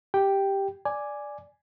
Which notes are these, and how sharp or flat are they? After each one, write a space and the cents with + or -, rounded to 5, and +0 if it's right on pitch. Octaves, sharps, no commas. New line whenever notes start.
G4 +0 G5 +0
D5 +0 G#5 +0